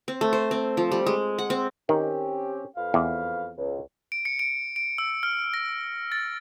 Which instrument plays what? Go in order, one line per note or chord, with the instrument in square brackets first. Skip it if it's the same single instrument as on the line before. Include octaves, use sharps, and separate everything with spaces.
[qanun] C4
A3
C5
C4
F3
G3
G#3
F#5
C4
[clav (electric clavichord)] D#3 [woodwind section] C4 C#4 G4
[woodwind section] F2 B4 F5
[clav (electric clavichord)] E2
[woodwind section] C#2
[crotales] D7
C#7
D7
D7
E6
F6
A#6
A6